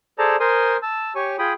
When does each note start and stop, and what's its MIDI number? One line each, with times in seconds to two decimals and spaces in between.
0.19 0.36 68
0.19 0.36 69
0.19 0.36 72
0.19 0.36 74
0.19 0.36 81
0.19 0.36 82
0.40 0.77 70
0.40 0.77 72
0.40 0.77 80
0.40 0.77 84
0.40 0.77 87
0.82 1.13 81
0.82 1.13 88
1.15 1.36 67
1.15 1.36 73
1.15 1.36 80
1.15 1.36 85
1.39 1.53 65
1.39 1.53 68
1.39 1.53 79
1.39 1.53 83
1.39 1.53 87